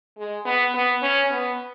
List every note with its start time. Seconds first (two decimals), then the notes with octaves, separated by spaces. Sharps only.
0.18 G#3
0.45 B3
0.75 B3
1.02 C#4
1.30 B3